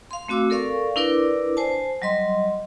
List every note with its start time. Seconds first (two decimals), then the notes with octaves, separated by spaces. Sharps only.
0.11 F5 C6
0.28 A3 C4 F#4 D6 E6
0.50 A4 A#4 D5 F5 C#6
0.96 D4 E4 A#4 B4 D5 D6
1.57 C5 G#5 A5
2.02 F#3 G3 D#5 C6